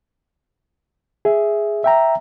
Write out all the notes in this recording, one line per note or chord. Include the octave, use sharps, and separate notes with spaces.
G#4 E5
E5 G5 A#5